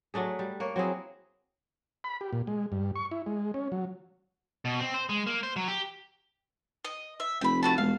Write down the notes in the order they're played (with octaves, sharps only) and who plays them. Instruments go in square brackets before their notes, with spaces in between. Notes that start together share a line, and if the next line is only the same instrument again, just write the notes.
[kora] F#3 A3 D4 G#4
G3
A#3 C#5
F#3 C4 E4 G#4
[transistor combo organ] B5
G4
A#2
G#3
G2
C#6
E4
G#3
C#4
F#3
[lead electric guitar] B2
C4
C5
G#3
A#3
C5
F#3
G4
[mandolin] D#5
E5
[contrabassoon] F1 [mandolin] G5 B5
[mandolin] A3 F#4 A5
[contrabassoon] E1 [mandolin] F5